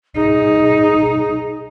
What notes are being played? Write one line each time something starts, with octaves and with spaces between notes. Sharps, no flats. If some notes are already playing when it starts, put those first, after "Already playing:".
D#4 G#4